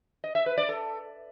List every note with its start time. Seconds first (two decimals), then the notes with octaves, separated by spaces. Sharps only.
0.24 D#5
0.35 E5
0.46 B4
0.58 D5
0.69 A4